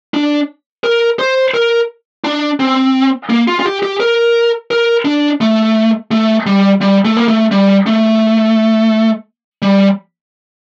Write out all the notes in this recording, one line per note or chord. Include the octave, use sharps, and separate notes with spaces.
D4
A#4
C5
A#4
D4
C4
A#3
F4
F4
G4
G4
A#4
A#4
D4
A3
A3
G3
G3
A3
A#3
A3
G3
A3
G3